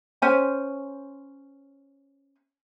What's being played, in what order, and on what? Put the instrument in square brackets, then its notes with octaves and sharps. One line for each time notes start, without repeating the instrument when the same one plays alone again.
[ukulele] C#4 C5 G#5